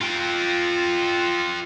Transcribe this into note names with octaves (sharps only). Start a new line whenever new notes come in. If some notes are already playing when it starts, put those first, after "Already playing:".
F4 G5